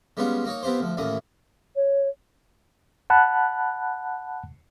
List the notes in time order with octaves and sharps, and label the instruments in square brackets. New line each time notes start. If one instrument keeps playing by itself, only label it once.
[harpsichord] G3 G#3 B3 C#4 F4
A#3 D#4 C#5
B3 C4 F4 G4 C5
D2 F3
A1 D#2 A2 A#3 D#6
[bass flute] C#5
[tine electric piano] F#5 A5 B5 F#6